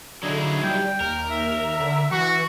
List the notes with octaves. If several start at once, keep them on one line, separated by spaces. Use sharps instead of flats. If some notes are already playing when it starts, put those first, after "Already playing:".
D3 F#3 D#4 E4 G#4
G3 G5
D#2 A#4
E5
D3
E3 F#4 C#6